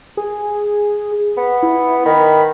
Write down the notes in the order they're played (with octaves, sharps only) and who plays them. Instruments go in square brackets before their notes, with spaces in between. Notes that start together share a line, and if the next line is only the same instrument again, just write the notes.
[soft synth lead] G#4
[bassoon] B3
[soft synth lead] E4
[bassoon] D#3 [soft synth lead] B5